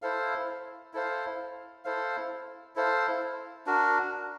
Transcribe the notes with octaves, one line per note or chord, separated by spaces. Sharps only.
E4 A4 C5 F5
E4 A4 C5 F5
E4 A4 C5 F5
E4 A4 C5 F5
D4 F#4 A#4